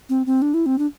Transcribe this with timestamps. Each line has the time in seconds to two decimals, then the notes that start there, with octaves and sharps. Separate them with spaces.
0.09 C4
0.26 C4
0.42 D4
0.54 E4
0.66 C4
0.78 D4